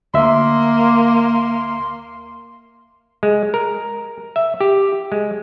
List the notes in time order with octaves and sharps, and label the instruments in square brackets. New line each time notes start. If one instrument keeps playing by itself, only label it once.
[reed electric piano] D2 E5 [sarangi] A#3 [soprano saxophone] C6
[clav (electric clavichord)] G#3
A#4
E5
G4
G#3